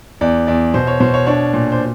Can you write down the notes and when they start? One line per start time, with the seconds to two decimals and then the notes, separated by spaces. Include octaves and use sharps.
0.21 E2 D5
0.47 E2 D5
0.74 B2 C5
0.87 C#5
1.00 B2 C5
1.14 C#5
1.26 D4 C#5
1.54 A#2
1.72 C5